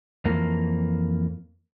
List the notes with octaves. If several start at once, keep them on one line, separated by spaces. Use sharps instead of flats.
F2 E3 A#3